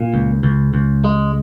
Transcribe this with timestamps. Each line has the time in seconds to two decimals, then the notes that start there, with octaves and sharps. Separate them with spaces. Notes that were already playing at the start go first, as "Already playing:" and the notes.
Already playing: A#2
0.14 C#2
0.43 C#2
0.74 C#2
1.04 G#3